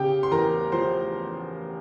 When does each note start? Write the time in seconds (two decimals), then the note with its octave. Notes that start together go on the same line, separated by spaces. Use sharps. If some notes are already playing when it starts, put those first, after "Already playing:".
Already playing: C#3 G4 G5
0.23 C6
0.31 E2 A#4 A#5
0.72 F3 C5 C6